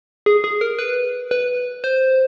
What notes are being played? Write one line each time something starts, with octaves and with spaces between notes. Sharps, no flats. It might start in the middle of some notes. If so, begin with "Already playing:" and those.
G#4
G#4
A#4
B4
B4
C5